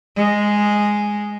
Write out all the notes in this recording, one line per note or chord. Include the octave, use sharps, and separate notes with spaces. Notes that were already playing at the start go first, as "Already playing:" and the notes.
G#3